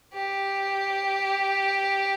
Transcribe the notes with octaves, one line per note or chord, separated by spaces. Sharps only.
G4